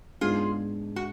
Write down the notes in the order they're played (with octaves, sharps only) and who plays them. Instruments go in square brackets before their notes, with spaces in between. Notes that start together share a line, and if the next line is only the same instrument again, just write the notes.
[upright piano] G#2 G#3 B3 D4 [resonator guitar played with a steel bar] F4 G#4
[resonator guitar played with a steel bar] F#4